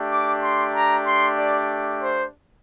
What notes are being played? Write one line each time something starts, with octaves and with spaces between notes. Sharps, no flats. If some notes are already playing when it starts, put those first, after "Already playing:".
Already playing: A3 D4 G4
D6
C6
A#5
C6
D5
C5